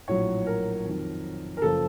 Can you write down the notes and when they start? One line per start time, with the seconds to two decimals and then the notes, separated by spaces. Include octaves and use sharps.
0.08 A#1 A2 F#3 C#5
0.46 A#4
0.85 F2 D#3 F#3
1.57 A#4
1.62 F#1 F3 A4